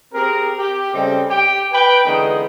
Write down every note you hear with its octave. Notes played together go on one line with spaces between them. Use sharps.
C4 G4 G#4 A#4
G4
C#3 G3 C4 A4 D#5 G5
G4 G5
B4 G5
D3 E3 G#3 B3 C#4 D#4